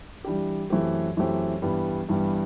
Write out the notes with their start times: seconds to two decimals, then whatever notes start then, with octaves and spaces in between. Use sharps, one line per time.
0.24 E3 G3 D4 G4
0.70 F#2 E3 A3 C4 G4
1.17 F#2 E3 A3 C4 G4
1.62 G2 E3 G3 B3
2.09 G2 E3 G3 B3